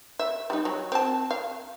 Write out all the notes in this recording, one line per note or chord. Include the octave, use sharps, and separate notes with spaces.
E5
G3 D#4
F#3
C4 A5
F5